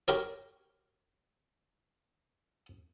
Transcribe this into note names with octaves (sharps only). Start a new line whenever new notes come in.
G4 A#4 C#5